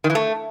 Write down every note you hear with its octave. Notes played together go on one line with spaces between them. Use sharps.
D#3
E3
A3